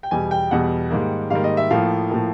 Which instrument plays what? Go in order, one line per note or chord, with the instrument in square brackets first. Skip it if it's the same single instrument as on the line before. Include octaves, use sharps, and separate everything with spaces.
[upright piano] G5
E2 B2 G3 G#5
G5
E2 B2 G3 F#5
G#2 D#3 G3 A#3
G#2 D#3 G3 A#3 F5
D#5
E5
A2 F3 A#3 F5
A2 F3 A#3